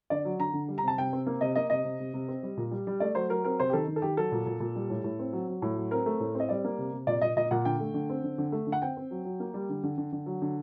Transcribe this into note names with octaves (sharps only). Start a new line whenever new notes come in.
D3 D5
F#3
D3 A#5
D3
G3
A#5
C3 A5
C3 G5
C4
A#3
C3 D#5
A#3 D#5
C3 D#5
C3
C3
C3
C4
G3
A#2
G3
G3
A3 D5
F#3 C5
F#3 A#4
C4 A#4
C3 C5
G4
D#3 A4
D#3
A4
D#3 G4
F#3 A4
A#2
A#2
A#2
G3
A2
A2
C4
F#3
F#3
A2
F#3
C4 A#4
A3
A2
C4 D#5
G3 D5
A#3
C3
C3
A#2 D5
A#2 D#5
A#2 D#5
A#2 F#5
D3 G5
A3
D3
C4
D3
D3
A3
D3
F#5
C4 G5
C4
F#3
F#3
A#3
G3
D3
D3
D3
D3
F#3
D3